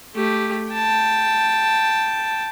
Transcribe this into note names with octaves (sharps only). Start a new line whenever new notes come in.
A3 G4
G5 A5